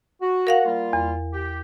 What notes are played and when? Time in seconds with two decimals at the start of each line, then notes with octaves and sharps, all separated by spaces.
0.22 F#4
0.47 A#4 F5 F#5
0.66 G3 A#3 F4
0.93 E2
1.34 G4